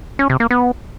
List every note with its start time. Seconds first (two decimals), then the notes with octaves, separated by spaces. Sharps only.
0.19 C#4
0.30 C3
0.40 A#3
0.51 B3